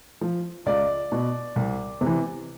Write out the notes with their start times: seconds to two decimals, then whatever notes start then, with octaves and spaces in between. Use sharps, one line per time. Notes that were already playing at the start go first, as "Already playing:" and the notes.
0.21 F3
0.66 C#2 D5
1.12 B2
1.56 C2
2.01 C3
2.06 E3